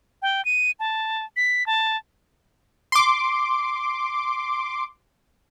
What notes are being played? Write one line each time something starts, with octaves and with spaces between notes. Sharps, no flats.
G5
D#7
A5
B6
A5
C6 D6